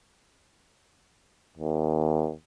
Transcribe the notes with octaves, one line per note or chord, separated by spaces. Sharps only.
D#2